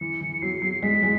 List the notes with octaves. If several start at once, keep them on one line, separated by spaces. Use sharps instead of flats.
E3 C#7
E3
F#3 C7
F#3
G#3 B6
G#3